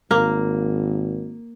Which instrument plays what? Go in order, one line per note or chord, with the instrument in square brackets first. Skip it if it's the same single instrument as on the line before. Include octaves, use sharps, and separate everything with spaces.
[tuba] G#1 [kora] A#3